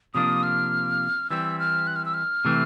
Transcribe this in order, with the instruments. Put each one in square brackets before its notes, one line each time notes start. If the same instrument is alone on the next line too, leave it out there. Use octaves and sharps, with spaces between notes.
[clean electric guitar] C3 F3 A#3 D4 [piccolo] D#6
[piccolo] F6
[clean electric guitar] E3 G3 C4 [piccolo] E6
[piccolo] F6
F#6
F6
E6
F6
[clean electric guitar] C3 E3 A3 C4